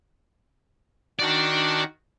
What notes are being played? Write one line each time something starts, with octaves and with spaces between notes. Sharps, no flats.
D#3 D4 F#4 D5